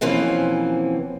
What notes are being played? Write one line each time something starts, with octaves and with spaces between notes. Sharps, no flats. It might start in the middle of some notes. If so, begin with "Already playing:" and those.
B2 E3 F3 A#3 C4 C#4